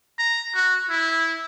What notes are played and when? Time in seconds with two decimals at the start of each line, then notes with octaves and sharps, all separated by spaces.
0.19 A#5
0.55 F#4
0.90 E4